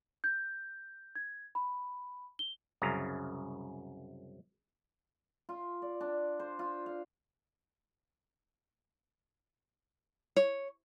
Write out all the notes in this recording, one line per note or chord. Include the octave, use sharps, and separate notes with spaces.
G6
G#6
B5
G7
C2 F#2 C#3 A#5
F4
D5
D4
C5
F4
F5
C#5